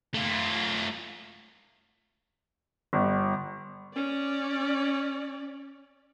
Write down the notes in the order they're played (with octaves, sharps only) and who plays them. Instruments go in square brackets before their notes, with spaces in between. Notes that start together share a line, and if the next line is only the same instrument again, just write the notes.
[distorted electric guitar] A3 F4
[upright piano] G1
[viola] C#4 D5